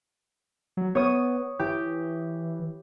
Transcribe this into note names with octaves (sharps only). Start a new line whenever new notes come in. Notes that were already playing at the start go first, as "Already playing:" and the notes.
F#3
B3 C#5 D#6
E3 G4